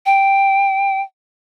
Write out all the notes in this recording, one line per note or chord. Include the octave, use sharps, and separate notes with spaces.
G5